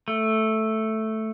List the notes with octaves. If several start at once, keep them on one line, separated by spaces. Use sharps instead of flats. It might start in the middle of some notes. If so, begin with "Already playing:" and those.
A3